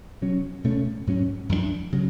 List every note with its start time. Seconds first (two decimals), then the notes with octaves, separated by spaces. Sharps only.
0.21 B2 F#3 C#4
0.64 B2 A3 C#4
1.07 G#2 F#3 C#4
1.49 F#2 F3 B3 D4
1.92 C#3 F#3